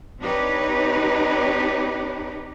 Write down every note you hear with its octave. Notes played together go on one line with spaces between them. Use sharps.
C4 D4 D#4 G4 B4 C#5